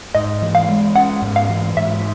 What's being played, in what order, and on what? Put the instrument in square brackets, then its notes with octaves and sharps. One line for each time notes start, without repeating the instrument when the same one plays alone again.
[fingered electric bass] G#2 [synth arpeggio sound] D#5
[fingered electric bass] E3
[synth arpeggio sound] F5
[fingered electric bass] G#3
[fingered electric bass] C#4 [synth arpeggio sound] F#5
[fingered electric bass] G#2
[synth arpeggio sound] F5
[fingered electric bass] E3
[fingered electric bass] G#2 [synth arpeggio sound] E5